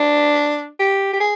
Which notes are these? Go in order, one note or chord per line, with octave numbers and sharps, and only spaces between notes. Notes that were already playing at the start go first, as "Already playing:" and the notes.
Already playing: D4
G4
G4
G#4